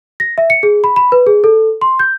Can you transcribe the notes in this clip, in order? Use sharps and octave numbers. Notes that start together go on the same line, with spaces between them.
A#6
E5
C#7
G#4
B5
B5
B4
G#4
A4
C6
G6